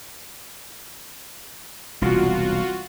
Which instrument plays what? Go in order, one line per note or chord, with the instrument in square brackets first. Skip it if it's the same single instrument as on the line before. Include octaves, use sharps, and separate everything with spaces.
[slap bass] E1 C2 A#2 [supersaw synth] F4 F#4